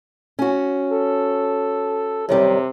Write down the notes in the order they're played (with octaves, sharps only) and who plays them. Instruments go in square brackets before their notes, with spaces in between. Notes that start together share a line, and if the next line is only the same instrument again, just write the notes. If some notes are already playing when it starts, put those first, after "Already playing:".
[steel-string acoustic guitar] C#4 F#4
[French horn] A4
[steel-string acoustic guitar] F#2 D#3 G3 [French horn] C3